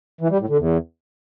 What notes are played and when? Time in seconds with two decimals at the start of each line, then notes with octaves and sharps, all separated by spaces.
0.21 E3
0.30 G3
0.40 A2
0.49 D3
0.58 E2